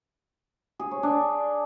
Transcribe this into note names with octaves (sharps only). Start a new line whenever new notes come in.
G#4
C#5
D4